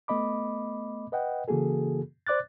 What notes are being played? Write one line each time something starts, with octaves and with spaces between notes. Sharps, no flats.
A3 B3 D#5 B5 D6
B4 D#5 F#5 G5
C#3 E3 A#3 F#4 G#4 A4
C5 D5 D6 F#6 A6